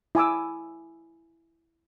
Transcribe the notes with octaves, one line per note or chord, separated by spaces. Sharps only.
E4 G#5 D6 E6